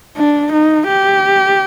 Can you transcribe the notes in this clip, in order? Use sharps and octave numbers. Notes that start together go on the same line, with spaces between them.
D4
D#4
G4